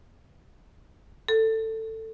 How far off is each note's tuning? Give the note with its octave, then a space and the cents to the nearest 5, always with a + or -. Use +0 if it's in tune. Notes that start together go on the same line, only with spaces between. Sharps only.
A4 +15